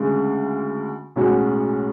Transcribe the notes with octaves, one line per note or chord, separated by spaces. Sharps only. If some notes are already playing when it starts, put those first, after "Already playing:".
Already playing: D2 C#3 G#3
B1 A2 G#3 C#4 F#4